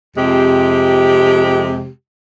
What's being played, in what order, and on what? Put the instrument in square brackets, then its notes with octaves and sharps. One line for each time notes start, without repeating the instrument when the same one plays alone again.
[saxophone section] F2 C3 G#3 G4